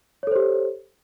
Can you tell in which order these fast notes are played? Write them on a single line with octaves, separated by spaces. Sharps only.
C#5 A4 C5 G4